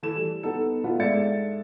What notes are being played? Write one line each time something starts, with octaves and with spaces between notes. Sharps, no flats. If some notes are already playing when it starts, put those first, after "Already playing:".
E3 A3 A4 E7
G3
B3 D#4 A4
A3 B3 D4 E4 F4
G#2 A4 D5 E5 A6 C#7